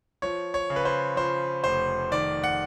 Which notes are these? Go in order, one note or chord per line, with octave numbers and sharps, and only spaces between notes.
F3 C#5
C#5
C#3
B4
C5
F3 C5
F1 C5
D#3 D5
F#5